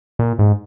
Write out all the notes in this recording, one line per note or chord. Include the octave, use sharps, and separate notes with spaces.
A#2
G#2